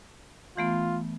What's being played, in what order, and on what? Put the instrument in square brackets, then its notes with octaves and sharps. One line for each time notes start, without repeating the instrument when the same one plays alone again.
[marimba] E3 A3 B3 [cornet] F4